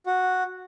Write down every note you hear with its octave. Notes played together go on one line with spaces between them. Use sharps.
F#4